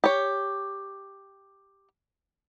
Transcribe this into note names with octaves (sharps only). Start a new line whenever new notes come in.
G4 C#5